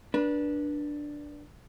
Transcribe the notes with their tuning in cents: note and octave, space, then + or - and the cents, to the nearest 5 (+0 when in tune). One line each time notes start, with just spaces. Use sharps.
D4 +0 B4 -30